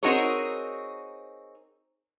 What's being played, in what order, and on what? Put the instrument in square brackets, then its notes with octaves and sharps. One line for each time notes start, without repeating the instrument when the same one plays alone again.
[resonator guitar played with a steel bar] C4 D#4 F#4 G#4 A#4 C#5